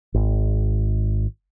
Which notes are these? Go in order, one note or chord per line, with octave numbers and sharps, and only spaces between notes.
G#1